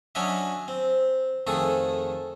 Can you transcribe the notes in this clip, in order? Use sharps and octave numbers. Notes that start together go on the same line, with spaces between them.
F#3 C#4 D4 C#5 D#5 E5
C4
F2 D#3 A3 G#4 A4